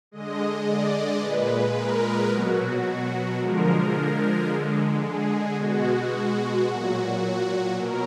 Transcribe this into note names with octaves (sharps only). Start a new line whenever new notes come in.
D3 G#3 D#5
D5
A#2 G#3 B4
A#4
B2 F#3 F#4
F#4
D3 F3 G#3 A#4
D3 G#3
G#4
B2 G#3 F#4
F#4
A#2 F#3 F#4
F#4
B2 F#3 A#4